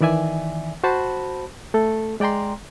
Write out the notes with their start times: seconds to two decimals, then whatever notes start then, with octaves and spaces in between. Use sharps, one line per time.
0.01 D#3 E3 D5 E5 G#5
0.84 F#4 C5 A5 B5
1.74 A3 A4
2.20 G#3 D5 G5 A#5 C6